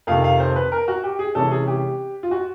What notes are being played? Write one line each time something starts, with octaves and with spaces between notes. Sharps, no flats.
F2 C3 D#3 F5
F5
C5
B4
A#4
F#4
G4
G#4
C3 E3 G#3 C#4 A4
G#4
G4
F4
F#4